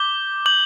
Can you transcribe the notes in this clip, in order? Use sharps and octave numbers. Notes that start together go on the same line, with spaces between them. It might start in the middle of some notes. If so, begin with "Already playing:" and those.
Already playing: D6 G6 G7
D6 G6 F#7